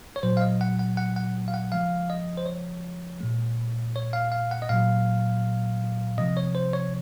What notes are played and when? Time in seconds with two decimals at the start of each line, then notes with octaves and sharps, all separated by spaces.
0.16 C#5
0.23 A#2 F#3 C5
0.37 F5
0.41 D#5
0.61 F#5
0.79 F#5
0.97 F#5
1.16 F#5
1.48 F5
1.54 F#5
1.72 C#3 F3 G#3 F5
2.10 D#5
2.37 C5
2.46 C#5
3.20 A#2 G#3
3.96 C#5
4.13 F5
4.32 F5
4.51 F#5
4.62 D#5
4.69 A#2 F#3 F5
6.18 C3 F3 G#3 D#5
6.37 C#5
6.55 C5
6.73 C#5